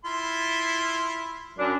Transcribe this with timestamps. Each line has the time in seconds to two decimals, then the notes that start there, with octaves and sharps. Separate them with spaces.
0.05 E4 F4 C6
1.59 F#2 D4